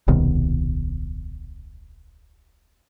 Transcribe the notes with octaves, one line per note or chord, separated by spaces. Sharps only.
D#1 C2 B2 D#3